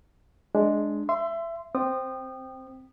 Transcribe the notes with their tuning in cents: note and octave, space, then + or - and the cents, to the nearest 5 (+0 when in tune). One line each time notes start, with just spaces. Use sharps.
G#3 +10 D4 +0
E5 +25 C6 -15
C4 +0 G5 -5 D#6 -30